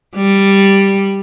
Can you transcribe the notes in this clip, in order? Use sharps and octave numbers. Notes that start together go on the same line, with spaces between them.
G3